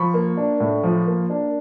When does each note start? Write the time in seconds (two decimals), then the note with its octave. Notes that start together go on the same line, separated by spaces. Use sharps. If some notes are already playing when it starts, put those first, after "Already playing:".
Already playing: F3 B5 C#6
0.14 A#3
0.37 D4
0.60 A2
0.83 F3
1.07 A#3
1.30 D4